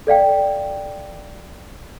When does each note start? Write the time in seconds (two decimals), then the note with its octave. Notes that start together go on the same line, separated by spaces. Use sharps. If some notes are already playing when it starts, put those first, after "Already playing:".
0.07 A4 D5 F5 G5